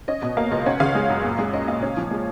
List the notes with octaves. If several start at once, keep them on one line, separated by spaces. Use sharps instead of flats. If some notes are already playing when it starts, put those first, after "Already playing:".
C#4 D#5
B2 D#5
A#3 F5
C#2 D#5
C#4 F#5
C#3 F5
G#3
F#2
A#2
G#3
C#4 D#5
A#2 F5
C#4
F3
G#3